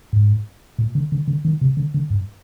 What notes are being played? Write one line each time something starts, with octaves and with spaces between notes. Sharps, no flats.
G#2
A#2
D3
D3
D3
D#3
C3
D3
D3
G2